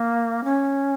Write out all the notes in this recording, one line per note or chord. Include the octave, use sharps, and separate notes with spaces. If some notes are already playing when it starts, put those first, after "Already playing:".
Already playing: A#3
C#4